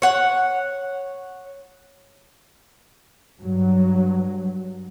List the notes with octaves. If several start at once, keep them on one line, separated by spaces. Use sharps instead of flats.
C#5 F#5
G2 F#3